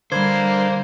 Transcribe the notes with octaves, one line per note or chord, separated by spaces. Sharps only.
D3 G3 A#3 C5 B5 G#6